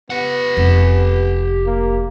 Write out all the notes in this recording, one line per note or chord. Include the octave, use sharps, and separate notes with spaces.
B3 G4 F#5
F1
A#3